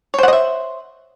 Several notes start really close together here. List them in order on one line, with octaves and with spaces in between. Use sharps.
C#5 C5 F#5 D#5 E5